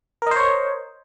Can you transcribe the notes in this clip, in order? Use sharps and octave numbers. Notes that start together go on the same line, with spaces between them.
A#4 C5 C#5 D#5